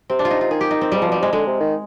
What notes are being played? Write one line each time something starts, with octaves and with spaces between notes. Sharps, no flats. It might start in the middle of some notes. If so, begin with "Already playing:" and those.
C3 C4
D4
F4
D#4
F4
D#3 G#4
G4
D#4
C4
G#2 G3
F3
B2 G3
C3 G#3
D3 G#3
C3
D#3